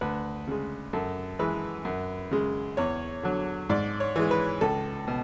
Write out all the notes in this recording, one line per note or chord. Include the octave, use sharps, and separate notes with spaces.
D2 B4
C#3 G#3
F#2 A4
E3 G#3 B4
F#2
C#3 G#3
E2 C#5
D3 F#3
G#2 D5
C#5
E3 G#3
B4
C#2 A4
B2